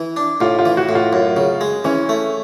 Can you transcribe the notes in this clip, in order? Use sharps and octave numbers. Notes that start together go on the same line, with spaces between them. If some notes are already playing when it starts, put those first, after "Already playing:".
Already playing: E3
D4
A2 F4
F4
E3
F#4
A2
F4
F#2
C#3
G#3
E3 C#4
A3